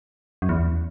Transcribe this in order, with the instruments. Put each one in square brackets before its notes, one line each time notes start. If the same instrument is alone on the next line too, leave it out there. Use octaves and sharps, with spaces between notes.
[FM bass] F#2
E2